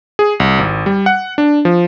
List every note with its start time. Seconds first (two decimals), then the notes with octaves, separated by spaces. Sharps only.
0.19 G#4
0.40 C2
0.59 G#1
0.86 G3
1.06 F#5
1.38 D4
1.65 F3